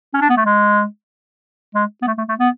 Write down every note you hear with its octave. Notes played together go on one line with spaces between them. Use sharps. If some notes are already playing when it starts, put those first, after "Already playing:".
C#4
D4
B3
A3
G#3
G#3
B3
A3
A3
A3
B3